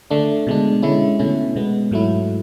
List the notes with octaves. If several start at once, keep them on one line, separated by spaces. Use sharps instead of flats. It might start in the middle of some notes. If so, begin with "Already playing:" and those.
D3 A3 D4
B2 G#3 D4
D3 G#3 C#4 E4
B2 A3 C#4 E4
B2 G#3 B3
G#2 F#3 A3 E4